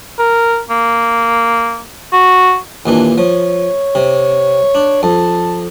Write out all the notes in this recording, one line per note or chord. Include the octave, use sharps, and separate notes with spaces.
A#4
A#3
F#4
D#2 A#2 E3 D4
F3 C#5
C3
D4
F2 A5